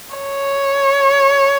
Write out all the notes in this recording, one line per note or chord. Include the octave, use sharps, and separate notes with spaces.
C#5